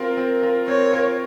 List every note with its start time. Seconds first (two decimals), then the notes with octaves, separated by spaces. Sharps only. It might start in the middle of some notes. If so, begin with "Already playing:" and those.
Already playing: C4 F4 A#4
0.17 C4
0.43 F4 A#4
0.68 C4 C#5
0.92 F4 A#4